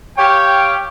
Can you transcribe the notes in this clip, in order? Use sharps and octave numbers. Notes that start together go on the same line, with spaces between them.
G4 C#5 F5 G5